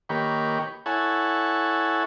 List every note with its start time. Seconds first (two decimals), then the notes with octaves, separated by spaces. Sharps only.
0.09 D#3 A#3 G4 B4 C#5
0.86 E4 A4 C#5 F#5 G#5